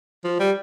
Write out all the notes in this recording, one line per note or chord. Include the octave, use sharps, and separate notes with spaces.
F3
G3